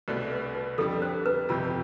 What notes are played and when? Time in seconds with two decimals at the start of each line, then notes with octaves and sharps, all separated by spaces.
0.08 C2 B2 A3 D4 C5
0.32 B4
0.55 B4
0.78 F2 D3 G3 A4
1.02 C5
1.26 B4
1.49 G1 F2 C3 F4